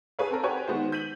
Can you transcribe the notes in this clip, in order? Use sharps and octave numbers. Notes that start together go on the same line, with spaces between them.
G#4 A4 B4 C#5 F5
C4 A4 A#4
F#4 G4 B4 C#5 G#5 C#6
D#3 G#3 B3 F#4 C5
G6 B6 D#7 F#7